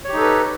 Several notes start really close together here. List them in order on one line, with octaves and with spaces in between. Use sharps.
C#5 G4 D#4 A4 B4